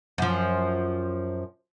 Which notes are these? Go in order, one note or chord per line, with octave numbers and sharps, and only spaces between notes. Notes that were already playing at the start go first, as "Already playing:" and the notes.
F#2 F3